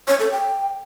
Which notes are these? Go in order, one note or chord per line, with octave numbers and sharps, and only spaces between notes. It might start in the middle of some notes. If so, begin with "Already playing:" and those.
C#5
A4
G5